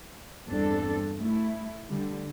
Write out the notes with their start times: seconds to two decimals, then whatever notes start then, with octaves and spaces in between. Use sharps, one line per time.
0.50 E2 G2 C4 D4 A4
1.20 A3 E4
1.90 D3 G3